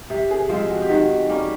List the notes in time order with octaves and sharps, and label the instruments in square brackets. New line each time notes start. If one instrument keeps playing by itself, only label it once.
[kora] C3 [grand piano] G4
[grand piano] G#4
[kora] F3 G#3 C4 [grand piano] G4
[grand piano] F#4
G4
[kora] D#3 [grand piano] F#4
[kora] G3 A#3 C#4